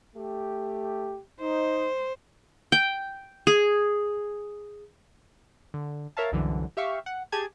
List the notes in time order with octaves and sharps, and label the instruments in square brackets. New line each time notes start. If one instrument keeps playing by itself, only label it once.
[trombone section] A3 G4
[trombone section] D#4 [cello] C5
[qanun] G5
G#4
[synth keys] D3
A#4 C#5 E5 F5 A5
C2 F#2 D3 E3
G4 E5 F5 C#6
F#5
G4 G#4 G#5 A5 G#6